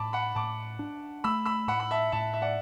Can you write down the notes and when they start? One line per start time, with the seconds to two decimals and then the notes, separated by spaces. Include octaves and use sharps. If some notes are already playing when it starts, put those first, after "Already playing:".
Already playing: A2 A5 B5 D6
0.13 F#5 B5
0.35 A2 A5 D6
0.79 D4
1.24 A3 B5 E6
1.45 B5 E6
1.68 A2 F#5 B5
1.80 B5
1.91 E5 A5
2.12 A2 E5 A5
2.33 E5
2.42 D5 F#5